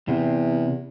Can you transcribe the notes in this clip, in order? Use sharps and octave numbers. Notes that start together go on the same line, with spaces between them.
E2 C3